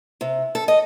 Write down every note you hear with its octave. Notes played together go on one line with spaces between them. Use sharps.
C3
A4
D#5